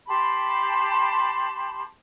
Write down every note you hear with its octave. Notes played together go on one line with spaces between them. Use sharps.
G4 A5 B5 C6